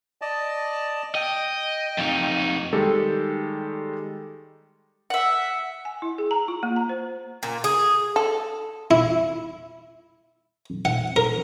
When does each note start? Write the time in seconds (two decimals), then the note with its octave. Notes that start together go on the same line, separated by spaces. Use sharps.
0.22 D5 D#5 A5
1.15 D#5 G5
1.98 F2 D#4
2.73 D#3 G3 G#3 G4 A4
5.10 E5 F#5
5.85 G#5
6.02 E4
6.18 G#4
6.31 A#5
6.48 F4
6.63 A#3
6.76 A#5
6.89 C5
7.43 A#2
7.64 G#4
8.16 A4
8.91 E4
10.85 F#5
11.16 A#4